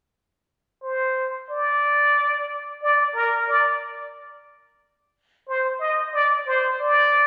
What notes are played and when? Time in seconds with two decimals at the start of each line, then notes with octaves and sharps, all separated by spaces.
0.83 C5
1.50 D5
2.83 D5
3.15 A#4
3.49 D5
5.48 C5
5.80 D#5
6.14 D5
6.47 C5
6.81 D5